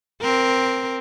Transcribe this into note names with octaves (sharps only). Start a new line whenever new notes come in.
C4 A#4